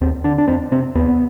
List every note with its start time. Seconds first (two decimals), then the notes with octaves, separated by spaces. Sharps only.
0.01 D#2 C4
0.24 D3 D4
0.38 D4
0.48 F2 C4
0.72 C3 C4
0.95 D#2 B3